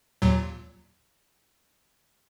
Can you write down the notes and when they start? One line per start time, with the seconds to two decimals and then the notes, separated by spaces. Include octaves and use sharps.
0.22 D#2 A#2 F#3